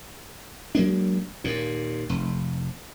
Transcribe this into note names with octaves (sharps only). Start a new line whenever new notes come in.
F#3 G#3 A#3 D4
D#2 A#2
F1